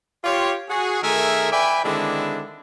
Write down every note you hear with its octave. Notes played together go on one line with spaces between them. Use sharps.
F4 G4 C#5
F#4 G#4
D#3 A3 G#4 A#4 E5 G#5
B4 D5 E5 G5 G#5 B5
D3 D#3 G#3 C4 D4 E4